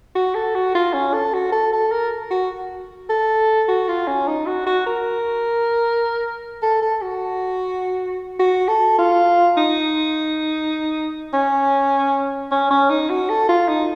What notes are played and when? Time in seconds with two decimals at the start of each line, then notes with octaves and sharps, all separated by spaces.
0.15 F#4
0.35 A4
0.55 F#4
0.75 F4
0.93 C#4
1.13 A4
1.34 F#4
1.52 A4
1.73 A4
1.91 A#4
2.31 F#4
3.09 A4
3.68 F#4
3.88 F4
4.07 C#4
4.28 D#4
4.47 F#4
4.66 F#4
4.86 A#4
6.63 A4
6.82 A4
7.02 F#4
8.39 F#4
8.68 A4
8.98 F4
9.57 D#4
11.33 C#4
12.51 C#4
12.71 C#4
12.90 D#4
13.10 F#4
13.29 A4
13.49 F4
13.68 D#4